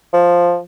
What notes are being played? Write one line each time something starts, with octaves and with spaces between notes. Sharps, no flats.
F3